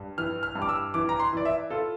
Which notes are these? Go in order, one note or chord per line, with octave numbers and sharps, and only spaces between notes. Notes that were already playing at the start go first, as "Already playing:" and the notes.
Already playing: G2
E3 F6
F6
G2
D6
E6
E3 D6
A#5
C6
E3 D5
E5
F4 A4